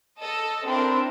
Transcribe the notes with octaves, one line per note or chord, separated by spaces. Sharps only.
A4 D#5
C4 D4 E4 A#4